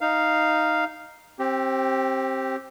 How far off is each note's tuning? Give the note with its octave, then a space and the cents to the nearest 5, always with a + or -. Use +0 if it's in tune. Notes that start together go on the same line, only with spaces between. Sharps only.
D#4 +0 F5 -5
C4 +20 G4 -10